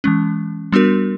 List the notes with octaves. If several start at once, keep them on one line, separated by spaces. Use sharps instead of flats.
E3 G#3 C#4
G3 B3 D4 F#4 A#4